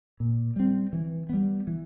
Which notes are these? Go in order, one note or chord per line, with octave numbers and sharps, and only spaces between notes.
A#2
G3 C4
E3
G3 B3
E3